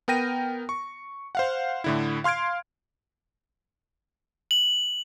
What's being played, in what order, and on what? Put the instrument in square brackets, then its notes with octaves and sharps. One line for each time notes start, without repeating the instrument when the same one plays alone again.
[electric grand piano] B3 A#4 G5 A#6 D#7
C#6
C5 F5 F#5
A2 D3 E4
F5 C6 F6 G#6 D7
[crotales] F#7